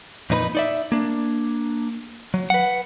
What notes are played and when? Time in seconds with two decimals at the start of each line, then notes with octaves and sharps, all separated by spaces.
0.30 F2 A#2 D#4 B4 B5
0.55 D#4 D5 E5
0.92 A#3 D4
2.34 F#3
2.50 B4 F#5